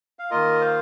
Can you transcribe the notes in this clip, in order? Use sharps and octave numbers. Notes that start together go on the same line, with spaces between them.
F5
D#3 A#3 F4 A#4 D#5
C5 F5